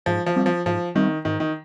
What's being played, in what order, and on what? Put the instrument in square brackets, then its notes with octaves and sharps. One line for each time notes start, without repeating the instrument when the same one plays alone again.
[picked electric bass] G#2 [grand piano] F3
[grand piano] F3
[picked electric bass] G3 C4
[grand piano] F3
[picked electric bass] G#2 [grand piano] F3
[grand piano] D#3 [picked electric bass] G3 C4
[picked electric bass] G#2 [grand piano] D#3
[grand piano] D#3